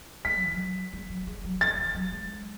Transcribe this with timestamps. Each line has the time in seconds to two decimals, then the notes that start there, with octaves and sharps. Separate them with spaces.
0.25 G#3 B6
0.35 F#3
0.43 E3
0.53 F#3
0.93 G#3
1.10 F#3
1.27 G#3
1.44 F#3
1.61 D3 A6
1.78 E3
1.95 F#3
2.12 G#3